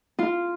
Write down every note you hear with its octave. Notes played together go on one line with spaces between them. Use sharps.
F4